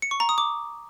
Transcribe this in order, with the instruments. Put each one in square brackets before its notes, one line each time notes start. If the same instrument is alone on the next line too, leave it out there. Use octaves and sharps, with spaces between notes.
[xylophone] C#7
C#6
A#5
D#6
D6